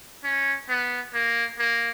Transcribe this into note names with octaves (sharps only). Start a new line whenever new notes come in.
C#4
B3
A#3
A#3